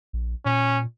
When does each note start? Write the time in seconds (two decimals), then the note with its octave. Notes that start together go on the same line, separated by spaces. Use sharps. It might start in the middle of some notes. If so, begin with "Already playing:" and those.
0.13 A#1
0.45 A#2 C#4